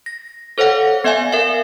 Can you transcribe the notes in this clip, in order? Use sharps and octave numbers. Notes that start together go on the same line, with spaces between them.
A#6
A4 C5 C#5 F5 F#5
B3 D5 E5 F5 G#5
A#4 E5 F5